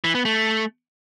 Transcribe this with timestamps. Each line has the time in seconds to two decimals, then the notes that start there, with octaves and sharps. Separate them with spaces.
0.04 E3
0.15 B3
0.25 A3